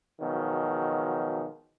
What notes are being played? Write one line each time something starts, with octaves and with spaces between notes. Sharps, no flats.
B2 D#3 F3 F#3 G#3